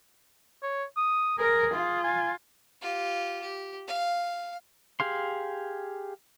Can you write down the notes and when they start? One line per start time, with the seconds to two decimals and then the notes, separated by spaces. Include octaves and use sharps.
0.63 C#5
0.97 D#6
1.39 G#4 A#4
1.74 F4
2.04 G#5
2.81 F4 G4
3.42 G4
3.87 F5
5.00 G4 G#4 F5 C6